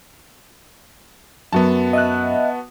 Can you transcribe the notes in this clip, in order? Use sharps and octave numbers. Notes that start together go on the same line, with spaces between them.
F#2 B3 F#4 A5
D#5 E5 F#6